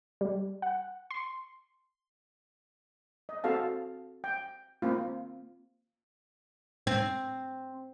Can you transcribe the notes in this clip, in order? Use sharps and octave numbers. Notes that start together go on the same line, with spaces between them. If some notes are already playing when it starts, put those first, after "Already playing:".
G3
F#5
C6
D#5
C4 F#4 A4 F5 A5
G5
A#3 C4 F4
C4